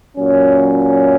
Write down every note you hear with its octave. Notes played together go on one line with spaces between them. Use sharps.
A#2 F#3 C#4